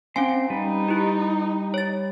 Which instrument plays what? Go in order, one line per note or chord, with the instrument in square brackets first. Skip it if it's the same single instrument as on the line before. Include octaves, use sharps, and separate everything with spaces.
[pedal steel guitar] C4 C6 [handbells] C#4 F5 G#5
[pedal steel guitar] G3 B4 [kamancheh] D#4
[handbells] E4 G4
C#5 A6